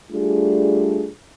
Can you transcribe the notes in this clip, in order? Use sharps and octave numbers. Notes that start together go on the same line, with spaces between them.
G3 A3 D4 F4 G#4